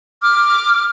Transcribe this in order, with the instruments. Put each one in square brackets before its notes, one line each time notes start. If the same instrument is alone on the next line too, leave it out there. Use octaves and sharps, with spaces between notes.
[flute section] D6 F6